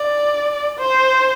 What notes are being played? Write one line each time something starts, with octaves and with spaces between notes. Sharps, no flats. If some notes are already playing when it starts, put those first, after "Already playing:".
Already playing: D5
C5